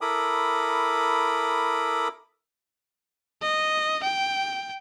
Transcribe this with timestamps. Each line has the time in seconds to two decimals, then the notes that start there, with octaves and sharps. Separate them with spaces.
0.01 E4 A4 A#4 B5 D6 D#6
3.42 D#5
4.03 G5